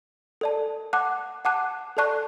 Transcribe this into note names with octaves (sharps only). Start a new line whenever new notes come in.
A4 D5 A5
F#5 A5 D6 F#6
F#5 A5 D6 F#6
A4 D5 A5 C#6 F#6